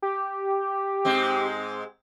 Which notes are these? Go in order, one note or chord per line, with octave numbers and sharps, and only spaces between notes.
G4
G#2 G#3 C4